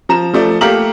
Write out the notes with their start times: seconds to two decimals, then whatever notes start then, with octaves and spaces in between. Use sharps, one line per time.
0.09 F3 A#5 E7
0.34 F3 A3 D5
0.61 A3 A#3 G4 A#5 F6 F#7